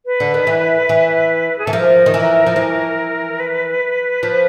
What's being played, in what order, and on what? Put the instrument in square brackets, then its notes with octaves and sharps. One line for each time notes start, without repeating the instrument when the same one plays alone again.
[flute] B4
[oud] D3
D#3
E3
E3
[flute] G#4
[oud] E3 [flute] A4
[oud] F3 [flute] A#4
[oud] D#3
E3
F3
E3
[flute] B4
[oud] F3